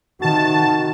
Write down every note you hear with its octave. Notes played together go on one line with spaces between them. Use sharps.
C3 D#3 F#4 A5